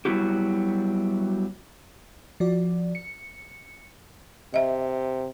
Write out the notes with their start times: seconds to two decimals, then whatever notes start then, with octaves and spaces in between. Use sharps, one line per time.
0.05 F#3 G3 B3 E4 F#4 G4
2.40 F3 F#4 D5
2.95 C#7
4.54 C3 D#5 E5